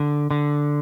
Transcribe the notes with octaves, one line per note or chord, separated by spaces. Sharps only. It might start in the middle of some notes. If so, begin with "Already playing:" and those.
Already playing: D3
D3